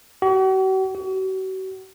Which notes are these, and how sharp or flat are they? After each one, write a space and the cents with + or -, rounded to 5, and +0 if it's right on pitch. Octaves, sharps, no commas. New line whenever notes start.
F#4 +45
F#4 +40